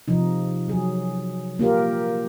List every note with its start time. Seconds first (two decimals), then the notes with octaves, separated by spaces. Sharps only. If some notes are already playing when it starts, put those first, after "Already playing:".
0.08 C3 F3 D#4
0.68 F#3 G#4
1.59 A#3 F4 G4 A#4